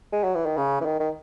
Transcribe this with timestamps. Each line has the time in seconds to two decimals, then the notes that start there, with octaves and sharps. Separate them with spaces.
0.13 G#3
0.24 F#3
0.35 E3
0.46 D#3
0.57 C#3
0.81 E3
0.85 D#3
1.00 D#3